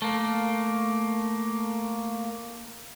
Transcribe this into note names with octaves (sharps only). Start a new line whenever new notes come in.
A3 A#3